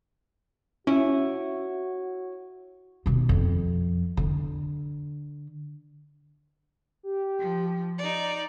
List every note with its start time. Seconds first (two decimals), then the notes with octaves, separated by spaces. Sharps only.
0.87 C#4 E4 F#4 C#5 C#6
3.06 D#2 B2
3.29 F2
4.17 D3
7.03 G4
7.39 F3
7.98 D#4 D5 D7